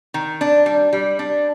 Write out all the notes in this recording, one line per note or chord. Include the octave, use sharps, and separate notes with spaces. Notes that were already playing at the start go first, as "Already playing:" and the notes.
D#3
D4
G3
G3
D4